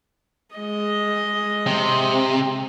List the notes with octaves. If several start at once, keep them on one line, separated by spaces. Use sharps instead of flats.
G#3 D#5
C3